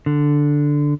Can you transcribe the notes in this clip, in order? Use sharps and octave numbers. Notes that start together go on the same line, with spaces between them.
D3